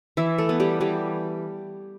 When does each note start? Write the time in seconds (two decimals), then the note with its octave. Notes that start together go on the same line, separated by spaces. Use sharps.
0.17 E3 E4 E5
0.38 A3 A4
0.49 B3
0.60 G3 G4
0.81 E3 G3 G4